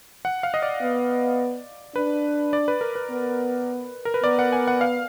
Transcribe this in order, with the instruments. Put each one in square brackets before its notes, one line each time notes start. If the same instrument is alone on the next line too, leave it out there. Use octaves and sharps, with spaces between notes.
[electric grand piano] F#5
F5
D#5
D5
[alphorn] B3
[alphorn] D4 [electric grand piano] B4
[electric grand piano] D5
B4
A#4
B4
[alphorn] B3
[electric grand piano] A#4
B4
[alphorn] B3 [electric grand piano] D5
[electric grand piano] F#5
G#5
F#5
F5